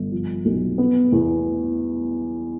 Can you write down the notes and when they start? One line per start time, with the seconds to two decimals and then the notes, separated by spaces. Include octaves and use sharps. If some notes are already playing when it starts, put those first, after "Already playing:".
Already playing: G1
0.12 F3
0.45 B1
0.78 B3
1.12 E2